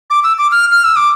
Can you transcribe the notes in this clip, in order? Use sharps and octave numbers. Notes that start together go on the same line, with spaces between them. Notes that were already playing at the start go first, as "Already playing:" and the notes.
D6
E6
D6
F6
F6
E6
D6